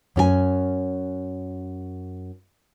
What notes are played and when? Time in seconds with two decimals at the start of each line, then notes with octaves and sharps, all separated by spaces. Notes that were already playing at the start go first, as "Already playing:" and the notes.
0.16 F#2 C#4 F#4 G#5